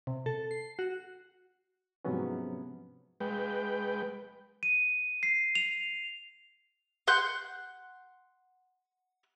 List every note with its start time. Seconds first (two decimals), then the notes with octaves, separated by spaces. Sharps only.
0.07 C3
0.26 A4
0.51 C7
0.79 F#4
2.05 G#2 C3 F3 F#3 B3 C#4
3.21 G#3 B4 G5
4.63 D#7
5.23 C7
5.55 F7
7.07 F#5 C6 F#6 G6